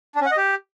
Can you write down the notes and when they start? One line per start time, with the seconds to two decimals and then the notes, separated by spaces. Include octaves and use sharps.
0.15 D4
0.21 C#4
0.26 F#5
0.31 D#5
0.37 G4